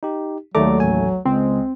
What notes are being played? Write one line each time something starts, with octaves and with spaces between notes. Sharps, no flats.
D#4 G4
D#2 F#3 A3 D5 A#5 D6
A1 G#5
C#2 G#3 C4